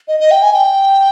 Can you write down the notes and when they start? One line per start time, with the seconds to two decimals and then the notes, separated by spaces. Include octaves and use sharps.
0.08 D#5
0.20 D#5
0.31 G5
0.42 G#5
0.54 G5